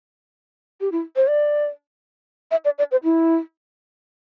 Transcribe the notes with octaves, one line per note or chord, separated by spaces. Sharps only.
G4
E4
C5
D5
E5
D5
D5
C5
E4